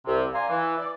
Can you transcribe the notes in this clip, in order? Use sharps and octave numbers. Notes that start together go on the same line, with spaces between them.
C2 C3
D5 F5 G#5 A#5 C6
E3
D5